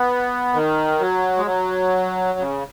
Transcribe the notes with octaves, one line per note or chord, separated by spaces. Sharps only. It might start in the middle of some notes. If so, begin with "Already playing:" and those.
Already playing: B3
D#3
F#3
G#3
F#3
C#3